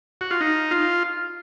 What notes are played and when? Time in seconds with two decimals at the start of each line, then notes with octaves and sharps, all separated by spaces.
0.21 F#4
0.31 F4
0.41 D#4
0.71 F4